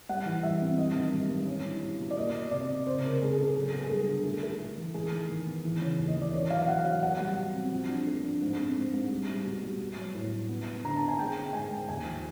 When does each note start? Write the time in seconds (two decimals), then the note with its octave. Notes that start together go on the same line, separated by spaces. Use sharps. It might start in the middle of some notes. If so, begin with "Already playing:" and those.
0.09 G3 F#5
0.26 E3
0.43 G3 E5
0.61 C4
0.78 G2 D#5
0.96 D#3
1.14 G2
1.30 G2
1.47 C#4
1.66 E4
1.83 B2
1.99 B2
2.11 D5
2.17 A#3 D#5
2.34 A#3
2.51 C3 D5
2.69 C3
2.86 C#3 C5
3.04 C#3 A#4
3.21 G#3 G#4
3.33 G#4
3.38 C#3 A4
3.56 F#3
3.73 B3
3.84 G#4
3.90 G2 A4
4.08 D3
4.25 A3
4.43 A3
4.59 A3
4.77 E3
4.94 G#3 G#4
5.12 D#3
5.29 D#3
5.46 B3
5.64 E3
5.81 C#3
5.99 D#2
6.08 D#5
6.17 E3 D5
6.33 B2 C#5
6.50 F#3 F5
6.62 F5
6.68 F#3 F#5
6.85 F#3 F5
7.03 B2 F#5
7.20 G3
7.38 B2
7.54 C4
7.72 F3
7.89 D4
8.07 A3
8.24 D4
8.42 G#2
8.59 C4
8.77 G#2
8.94 G#2
9.11 G3
9.28 G3
9.45 B2
9.63 G3
9.80 B3
9.97 F#3
10.14 A2
10.33 A2
10.49 B3
10.66 B3
10.84 D3 A#5
10.96 A5
11.02 B3
11.08 G#5
11.19 G#3 G5
11.36 C#4
11.53 G#2 G#5
11.70 G#2
11.89 D#2 G#5
12.06 F3